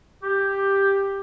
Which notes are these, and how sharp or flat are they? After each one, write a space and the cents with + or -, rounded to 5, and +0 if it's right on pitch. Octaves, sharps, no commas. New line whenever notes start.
G4 +5